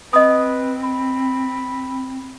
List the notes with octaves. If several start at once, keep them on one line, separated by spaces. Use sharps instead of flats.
C4 B4 D#5 D#6
B5